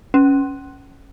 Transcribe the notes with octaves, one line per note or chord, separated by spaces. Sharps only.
C#4